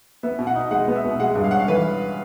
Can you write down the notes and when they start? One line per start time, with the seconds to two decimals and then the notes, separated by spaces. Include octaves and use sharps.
0.23 B3 E5
0.39 B2
0.47 F#5
0.56 D#4
0.71 G#3 F#5
0.88 B3
0.96 E5
1.04 B2
1.20 G#3 F#5
1.35 G2
1.44 F5
1.51 C#4 F#5
1.59 F5
1.68 E3 B4